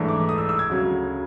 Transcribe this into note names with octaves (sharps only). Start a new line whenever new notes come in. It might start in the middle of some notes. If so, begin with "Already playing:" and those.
Already playing: G#2 E3 A3 D4
D6
D#6
E6
E6
G#6
D2 C#3 F#3